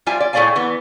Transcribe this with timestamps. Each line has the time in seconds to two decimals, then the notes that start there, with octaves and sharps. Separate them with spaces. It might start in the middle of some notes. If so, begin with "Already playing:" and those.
0.06 F3 G3 F4 E5 G#5
0.20 D5
0.33 A2 G#3 A3 D5 F5 G#5
0.56 E3 B3